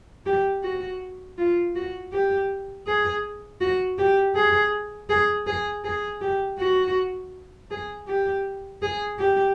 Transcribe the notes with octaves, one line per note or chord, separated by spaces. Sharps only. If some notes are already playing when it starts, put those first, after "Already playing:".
G4
F#4
F4
F#4
G4
G#4
F#4
G4
G#4
G#4
G#4
G#4
G4
F#4
G#4
G4
G#4
G4